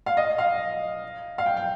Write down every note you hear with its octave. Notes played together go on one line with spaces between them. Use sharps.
F5
D#5
F5
F5
G5
G5